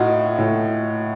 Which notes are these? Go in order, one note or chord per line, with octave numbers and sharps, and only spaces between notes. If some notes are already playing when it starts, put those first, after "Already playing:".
Already playing: A2 D#4 F4 F#4
A2